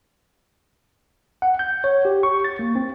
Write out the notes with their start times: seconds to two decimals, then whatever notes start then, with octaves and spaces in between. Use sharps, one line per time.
1.42 F#5
1.59 G6
1.84 C#5
2.05 G4
2.23 C#6
2.44 A6
2.59 A#3
2.76 C4